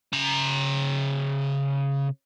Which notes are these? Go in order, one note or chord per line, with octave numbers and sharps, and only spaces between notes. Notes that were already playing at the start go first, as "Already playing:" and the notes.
C#3 A#5